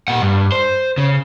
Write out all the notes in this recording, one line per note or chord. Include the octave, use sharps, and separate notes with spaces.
A#2 F#5
G2
C5
C#3